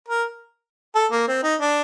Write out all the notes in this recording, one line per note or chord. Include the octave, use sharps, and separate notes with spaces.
A#4
A4
A#3
C4
D#4
D4